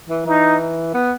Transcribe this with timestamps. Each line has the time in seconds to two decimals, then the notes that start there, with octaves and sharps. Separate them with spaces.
0.09 E3
0.26 E3 D#4
0.94 B3